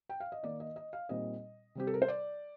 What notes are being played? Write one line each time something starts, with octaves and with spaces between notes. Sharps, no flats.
G5
F5
D#5
D#3 A#3 D#4 D5
D#5
D#5
F5
A#2 G3 C4 D#4 D#5
C3 G3 C4 G4
A4
A#4
C5
D5